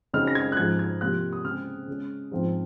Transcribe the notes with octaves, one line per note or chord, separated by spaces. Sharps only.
F#2 C#3 F#3 C4 D#4 F6
A#6
G#6
F#6
G#2 F3 G#3 G#6
G#6
C3 F3 A#3 F4 F#6
D#6
C#3 G#3 C4 F6
C#3 G#3 C#4
G#2 F3 C4